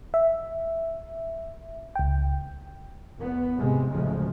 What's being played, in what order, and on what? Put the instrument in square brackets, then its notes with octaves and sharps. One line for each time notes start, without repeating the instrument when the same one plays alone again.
[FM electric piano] E5
C#2 G5
[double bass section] E2 B3
G#2 C3 G#3
A1 D2 C#3 F3 G#3